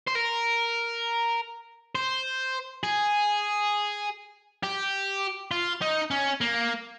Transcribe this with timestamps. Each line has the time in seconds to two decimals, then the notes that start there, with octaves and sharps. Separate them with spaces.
0.08 C5
0.15 A#4
1.95 C5
2.83 G#4
4.63 G4
5.51 F4
5.82 D#4
6.11 C#4
6.41 A#3